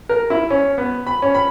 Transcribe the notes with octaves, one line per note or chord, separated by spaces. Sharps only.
A#4
E4
C#4
B3
B5
C#4
B5